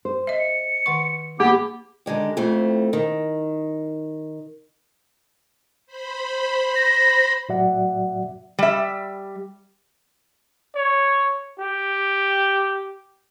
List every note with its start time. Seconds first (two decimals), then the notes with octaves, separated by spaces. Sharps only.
0.05 C5
0.27 D#5 E5
0.39 C#7
0.86 D#3 F#5 C#6
1.40 A#3 B3 E4 G4 G#4
2.06 D3 D#3 G#3 G4
2.37 F2 A2 A3 C4
2.93 D#3
5.86 C5 B5
6.76 A#6
7.49 A2 F#3 F#4 D5 E5 F#5
8.59 G3 E5
10.75 C#5
11.60 G4